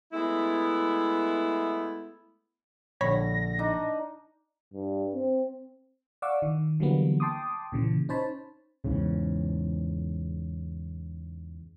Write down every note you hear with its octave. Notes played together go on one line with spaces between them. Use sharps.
G#3 A3 B3 E4
A#1 D3 C#5 B5 A#6
D4 D#4
G2
C4
D5 F5 F#5 C#6 D6 E6
D#3
D3 E3 F#3 G3 A#3 B3
G5 A5 C6 D6 D#6
A#2 C#3 E3
C#4 D#4 C5 C#5 A5 B5
E2 G#2 C#3